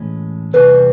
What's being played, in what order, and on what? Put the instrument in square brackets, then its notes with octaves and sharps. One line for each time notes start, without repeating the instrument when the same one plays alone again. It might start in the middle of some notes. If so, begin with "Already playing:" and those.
Already playing: [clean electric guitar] A2 E3 G#3 C#4
[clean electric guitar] E2 C3 E3 G3 C4 [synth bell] B4